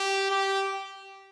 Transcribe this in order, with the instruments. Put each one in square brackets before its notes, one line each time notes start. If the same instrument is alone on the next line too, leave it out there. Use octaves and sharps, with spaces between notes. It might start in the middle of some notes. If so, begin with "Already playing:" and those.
Already playing: [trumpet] G4
G4